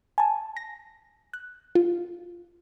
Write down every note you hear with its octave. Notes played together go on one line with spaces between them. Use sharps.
G#5 A5
A#6
F#6
F4